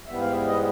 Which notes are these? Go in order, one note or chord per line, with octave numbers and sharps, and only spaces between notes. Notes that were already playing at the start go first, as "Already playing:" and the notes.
G#2 E3 G3 B3 E5
F5
E5
D#5